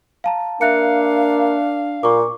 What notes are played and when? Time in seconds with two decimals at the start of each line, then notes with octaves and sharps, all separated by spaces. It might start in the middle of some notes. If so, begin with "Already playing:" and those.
0.24 F5 A5 A#5
0.61 A#3 D4 E5 F5 F#6 C#7
2.03 A#2 C#6 D6